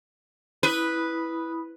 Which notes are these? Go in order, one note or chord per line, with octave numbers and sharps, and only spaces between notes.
E4 B4 B5 D#6